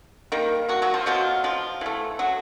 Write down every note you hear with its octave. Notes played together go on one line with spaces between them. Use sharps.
D#3 G3 A#3
F#3 F#4
F#3 F#4
F3 F4
B2 F3 F#3 B3 F4
F3 F4
E3 A3
F#3 F#4